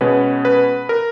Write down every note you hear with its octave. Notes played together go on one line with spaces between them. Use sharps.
B2 G#3 C#4 B4
B4
A#4